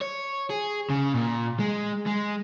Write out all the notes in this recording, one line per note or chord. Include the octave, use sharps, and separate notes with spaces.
C#5
G#4
C#3
A#2
G#3
G#3